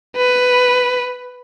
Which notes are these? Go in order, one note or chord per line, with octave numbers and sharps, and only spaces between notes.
B4